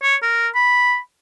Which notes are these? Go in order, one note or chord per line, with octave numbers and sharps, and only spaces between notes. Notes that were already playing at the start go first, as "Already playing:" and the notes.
C#5
A#4
B5